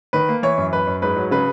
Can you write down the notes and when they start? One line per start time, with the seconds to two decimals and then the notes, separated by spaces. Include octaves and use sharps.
0.13 D#3 B4
0.29 A#3
0.43 E3 C#5
0.58 F#2
0.73 F#2 B4
0.87 F#2
1.02 G#2 B4
1.16 F#3
1.31 C#3 B4